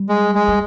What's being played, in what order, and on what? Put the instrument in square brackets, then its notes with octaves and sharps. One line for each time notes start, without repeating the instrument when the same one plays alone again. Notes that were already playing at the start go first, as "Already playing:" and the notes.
Already playing: [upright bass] G3
[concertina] G#3
G#3
[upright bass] G3